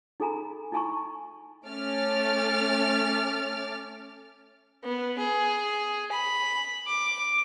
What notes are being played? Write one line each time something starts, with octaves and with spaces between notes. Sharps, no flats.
D#4 G#4 A4 G#5 A#5 B5
D#4 E4 G#5 A5 B5 C#6
A3 C#4 D6 F6 A6
B3
G#4
B5
D6